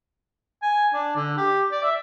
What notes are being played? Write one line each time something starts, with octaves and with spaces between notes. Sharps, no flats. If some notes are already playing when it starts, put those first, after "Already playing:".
G#5
D4
D3
G4
D5
E5